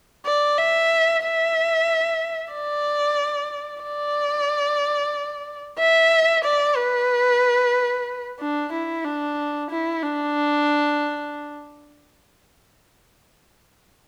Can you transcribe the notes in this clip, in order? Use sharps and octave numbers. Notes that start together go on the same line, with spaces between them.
D5
E5
E5
D5
D5
E5
D5
B4
D4
E4
D4
E4
D4